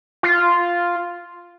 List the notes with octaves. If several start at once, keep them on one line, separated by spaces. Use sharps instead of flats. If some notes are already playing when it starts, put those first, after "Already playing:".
F4